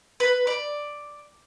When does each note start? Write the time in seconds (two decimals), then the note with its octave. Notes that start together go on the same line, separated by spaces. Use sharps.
0.20 B4
0.47 D5